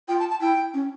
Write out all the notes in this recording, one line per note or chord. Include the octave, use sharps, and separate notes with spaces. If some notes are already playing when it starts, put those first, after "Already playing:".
F4 G5
A5
A5
E4 G5
C#4